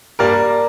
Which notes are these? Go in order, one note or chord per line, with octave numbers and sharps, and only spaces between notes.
G2 G3 A#3 A#4 D5